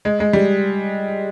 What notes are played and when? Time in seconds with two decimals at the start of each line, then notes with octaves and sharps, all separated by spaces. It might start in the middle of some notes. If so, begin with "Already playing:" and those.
0.05 G#3
0.20 G#3
0.33 G3